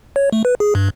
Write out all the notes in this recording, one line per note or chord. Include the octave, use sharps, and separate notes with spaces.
C#5
A3
B4
G#4
G2